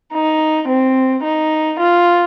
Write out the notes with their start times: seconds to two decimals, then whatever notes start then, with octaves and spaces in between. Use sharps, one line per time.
0.13 D#4
0.68 C4
1.24 D#4
1.79 F4